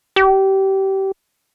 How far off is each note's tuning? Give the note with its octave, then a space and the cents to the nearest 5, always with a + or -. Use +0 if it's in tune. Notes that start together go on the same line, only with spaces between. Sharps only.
G4 -25